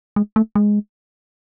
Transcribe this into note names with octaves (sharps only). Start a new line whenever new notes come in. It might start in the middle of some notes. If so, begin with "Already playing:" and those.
G#3
A3
G#3